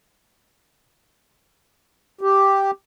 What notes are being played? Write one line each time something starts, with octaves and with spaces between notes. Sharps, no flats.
G4